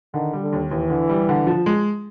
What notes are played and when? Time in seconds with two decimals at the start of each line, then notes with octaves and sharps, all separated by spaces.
0.14 D3 D#3
0.33 G3
0.42 D3
0.53 D#2
0.71 D#2 E3
0.90 D3
1.09 G3
1.29 D3
1.47 F3
1.66 G#3